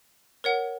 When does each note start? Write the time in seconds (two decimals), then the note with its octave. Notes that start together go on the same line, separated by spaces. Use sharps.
0.44 A#4 C#5 F#5